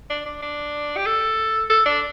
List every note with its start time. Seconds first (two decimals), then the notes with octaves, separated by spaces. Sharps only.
0.10 D4
0.26 D4
0.42 D4
0.96 G4
1.06 A4
1.70 A4
1.86 D4